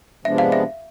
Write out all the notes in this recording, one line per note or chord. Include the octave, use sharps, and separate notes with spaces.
C3 F3 G#3 B3 D4 E5
F5
E5